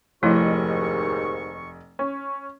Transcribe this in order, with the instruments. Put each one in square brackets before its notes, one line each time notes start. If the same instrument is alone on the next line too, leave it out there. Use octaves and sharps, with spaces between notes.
[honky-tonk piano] F1 D#5 [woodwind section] D#2 G#2 C#6 [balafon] F3 A3 E4
[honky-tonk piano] C#4